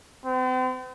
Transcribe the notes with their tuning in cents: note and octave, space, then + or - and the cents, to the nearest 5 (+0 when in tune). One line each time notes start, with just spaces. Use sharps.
C4 -40